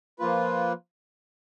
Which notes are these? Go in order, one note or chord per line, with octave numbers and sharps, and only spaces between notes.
F3 A#3 F4 B4